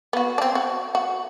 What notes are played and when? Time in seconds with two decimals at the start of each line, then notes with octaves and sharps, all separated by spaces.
0.13 B3 F#4
0.38 C4 D4
0.55 F#4
0.95 F#4